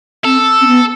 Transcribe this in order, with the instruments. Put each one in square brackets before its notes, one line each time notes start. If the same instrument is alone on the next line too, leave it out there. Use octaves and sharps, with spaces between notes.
[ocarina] C4 [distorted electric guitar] A4
[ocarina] C4
B3